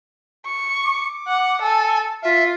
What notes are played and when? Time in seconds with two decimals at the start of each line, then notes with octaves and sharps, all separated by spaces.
0.46 C#6
0.84 D6
1.28 F#5
1.62 A4 G#5
2.23 F4 E5